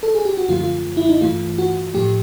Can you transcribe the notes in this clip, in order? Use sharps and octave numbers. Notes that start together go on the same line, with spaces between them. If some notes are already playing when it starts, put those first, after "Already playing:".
A4
G#4
G4
F#4
F#2 D3 F3 A3 F4
F4
E4
D#4
G2 E3 A3 F4
F#4
A2 F3 A3 G4